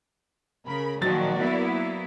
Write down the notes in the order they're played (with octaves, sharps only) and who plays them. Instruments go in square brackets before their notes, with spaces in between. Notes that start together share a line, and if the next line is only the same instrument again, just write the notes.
[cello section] C#3 [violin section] A#4 B5
[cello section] A#2 D#3 F3 [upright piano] F#3 A6 [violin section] F#4 A#4 D5
[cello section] A#3 B3 E4